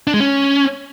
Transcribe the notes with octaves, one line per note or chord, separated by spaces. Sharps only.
D4
G#3
C#4